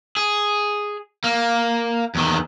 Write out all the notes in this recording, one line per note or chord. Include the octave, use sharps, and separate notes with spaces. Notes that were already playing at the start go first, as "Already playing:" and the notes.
G#4
A#3
E2 D#3